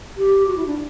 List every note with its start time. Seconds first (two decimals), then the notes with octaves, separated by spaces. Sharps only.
0.17 G4
0.47 F#4
0.56 E4
0.67 D4